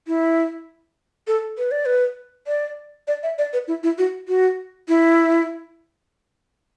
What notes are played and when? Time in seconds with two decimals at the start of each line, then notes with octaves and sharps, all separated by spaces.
0.07 E4
1.27 A4
1.58 B4
1.71 D5
1.86 B4
2.47 D5
3.08 D5
3.23 E5
3.38 D5
3.53 B4
3.68 E4
3.83 E4
3.98 F#4
4.28 F#4
4.88 E4